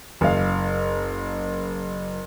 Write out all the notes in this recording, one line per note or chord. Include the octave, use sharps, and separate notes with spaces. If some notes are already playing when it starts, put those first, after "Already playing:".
F#1 F5